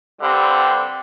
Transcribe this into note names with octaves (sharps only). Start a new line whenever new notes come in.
G2 D3 G3 C4